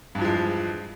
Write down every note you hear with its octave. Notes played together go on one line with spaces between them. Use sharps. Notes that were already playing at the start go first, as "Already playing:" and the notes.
E2 G2 F3 G#3